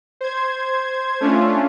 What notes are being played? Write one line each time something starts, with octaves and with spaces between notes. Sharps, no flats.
C5 G#6
A3 C#4 D4 F4